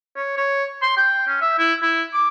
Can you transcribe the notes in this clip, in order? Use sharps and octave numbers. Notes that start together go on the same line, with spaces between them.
C#5
C#5
C6
G5
C#4
E5
E4
E4
D6